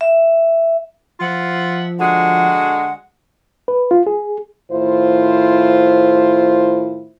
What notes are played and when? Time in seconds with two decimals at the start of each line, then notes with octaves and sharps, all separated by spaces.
0.01 E5
1.20 F3 F4 E5 F#5
2.00 D3 G#3 F#4 F#5
3.68 B4
3.91 F4
4.07 G#4
4.71 A2 D#3 E4 F4 C5